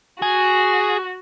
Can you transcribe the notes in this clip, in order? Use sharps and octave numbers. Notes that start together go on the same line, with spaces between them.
F#4 G#4